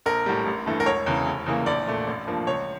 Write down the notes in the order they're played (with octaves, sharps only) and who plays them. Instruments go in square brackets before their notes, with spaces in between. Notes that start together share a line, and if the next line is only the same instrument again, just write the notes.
[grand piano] A#1 A#4
A2 G3
A1
G2 E3 A3
A#4
E1 C#5
E2 C#3 E3
F1
E2 C#3 E3 A#3
A#1 D5
A#2 A3
A1
G2 F3 A#3
C#2 C#5